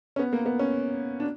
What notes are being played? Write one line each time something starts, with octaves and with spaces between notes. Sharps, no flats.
C#4
B3
A#3
B3
C#4
D4